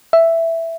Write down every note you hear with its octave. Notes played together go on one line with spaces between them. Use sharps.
E5